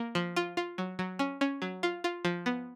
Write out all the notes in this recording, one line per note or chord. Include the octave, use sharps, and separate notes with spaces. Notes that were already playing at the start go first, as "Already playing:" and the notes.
Already playing: A#3
F3
F4
F4
F#3
F#3
C#4
C#4
F#3
F4
F4
F3
B3